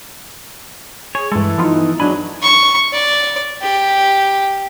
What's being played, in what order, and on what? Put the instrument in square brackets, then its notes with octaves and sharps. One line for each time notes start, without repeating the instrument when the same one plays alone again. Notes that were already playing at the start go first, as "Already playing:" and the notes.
[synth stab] G#4 [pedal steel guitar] C#5
[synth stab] G2 G#3 [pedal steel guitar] E3 A4
[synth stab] F3 B3 F4 [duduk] D#4
[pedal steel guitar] F#3 G#3 B5 [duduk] D4 [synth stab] G#5
[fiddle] C#6
D5
G4